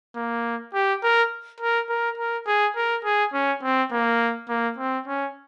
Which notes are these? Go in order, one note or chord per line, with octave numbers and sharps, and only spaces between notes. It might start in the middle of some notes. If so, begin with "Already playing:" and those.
A#3
G4
A#4
A#4
A#4
A#4
G#4
A#4
G#4
C#4
C4
A#3
A#3
C4
C#4